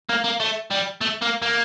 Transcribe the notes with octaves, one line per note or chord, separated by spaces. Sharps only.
A#3
A#3
A3
G3
A3
A#3
A#3